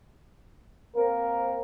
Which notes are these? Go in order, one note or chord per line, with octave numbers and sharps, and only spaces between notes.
A#3 C4 A#4